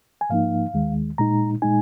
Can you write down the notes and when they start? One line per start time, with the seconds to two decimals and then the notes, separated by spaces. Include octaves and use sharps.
0.21 G#5
0.30 G#2 F3 A#3 D#4 F5
0.74 D#2 D#3 G#3
1.18 A#2 G#3 D#4 A#5
1.62 A#2 G#3 D#4 G#5